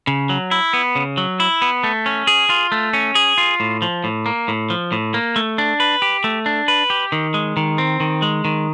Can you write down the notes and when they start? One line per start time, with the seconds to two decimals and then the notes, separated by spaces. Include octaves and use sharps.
0.07 C#3
0.29 F#3
0.51 E4
0.73 B3
0.95 C#3
1.17 F#3
1.40 E4
1.62 B3
1.84 A3
2.06 C#4
2.27 G#4
2.50 F4
2.72 A3
2.93 C#4
3.15 G#4
3.38 F4
3.60 A2
3.82 F3
4.04 A2
4.26 A#3
4.48 A2
4.70 F3
4.92 A2
5.14 A#3
5.36 A3
5.58 D4
5.80 B4
6.02 G4
6.24 A3
6.46 D4
6.68 B4
6.90 G4
7.12 D#3
7.34 G#3
7.57 D#3
7.78 C4
8.00 D#3
8.22 G#3
8.45 D#3